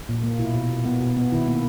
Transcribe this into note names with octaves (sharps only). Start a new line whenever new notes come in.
A#2
A#3
B2 E4
B2
B2
B3
B2
B3
D#3 E4
A#3